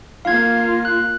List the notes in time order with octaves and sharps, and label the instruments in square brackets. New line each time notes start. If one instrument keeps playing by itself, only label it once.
[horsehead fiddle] A#3 F4 [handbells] F5 G#6
[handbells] F#6